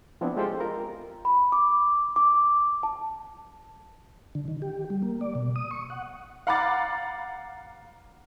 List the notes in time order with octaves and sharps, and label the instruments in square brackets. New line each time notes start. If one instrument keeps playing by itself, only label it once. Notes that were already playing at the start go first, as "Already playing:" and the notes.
[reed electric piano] F3 B3 C4 D4 E4
G#3 F4 G4 A4 C5 G5
F4 A#4 A#5
[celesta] B5
D6
D6
A5
[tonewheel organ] D3
D#3
G4
G3
A#3
D5
B2
D#6
C#6
F#5
[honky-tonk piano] F5 F#5 A#5 B5 D6 A6